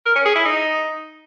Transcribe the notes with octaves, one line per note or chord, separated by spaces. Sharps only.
A#4
C#4
G#4
E4
D#4